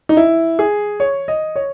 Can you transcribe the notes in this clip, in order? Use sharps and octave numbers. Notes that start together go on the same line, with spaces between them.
D#4
E4
G#4
C#5
D#5
C#5